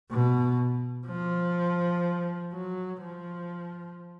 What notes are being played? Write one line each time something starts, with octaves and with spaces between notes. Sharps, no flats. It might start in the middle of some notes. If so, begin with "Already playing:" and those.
B2
F3
F#3
F3